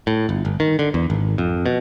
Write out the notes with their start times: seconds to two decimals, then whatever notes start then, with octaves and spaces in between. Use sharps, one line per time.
0.07 A2
0.29 G1
0.45 G1
0.60 D#3
0.79 D3
0.94 E2
1.10 G#1
1.38 F2
1.66 B2